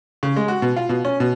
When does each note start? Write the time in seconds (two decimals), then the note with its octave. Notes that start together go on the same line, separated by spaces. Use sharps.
0.23 C#3
0.36 G#3
0.48 F#4
0.62 B2
0.77 F4
0.89 B2
1.05 C#4
1.20 B2